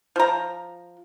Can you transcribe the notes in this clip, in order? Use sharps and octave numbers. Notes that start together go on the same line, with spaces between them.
F3 A#5